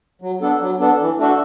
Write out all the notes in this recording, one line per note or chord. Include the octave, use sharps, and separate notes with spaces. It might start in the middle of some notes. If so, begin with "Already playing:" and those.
F#3
B3 D4 A4
F#3
B3 D4 A4
E3
A3 D4 F#4 A4